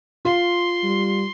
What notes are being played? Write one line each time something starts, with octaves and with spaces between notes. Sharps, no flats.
F4 C6
G3